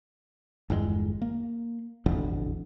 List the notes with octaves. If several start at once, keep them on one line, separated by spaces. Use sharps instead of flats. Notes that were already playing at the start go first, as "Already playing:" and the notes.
G1 E2 C3 G#3
A#3
E1 A1 F2 D3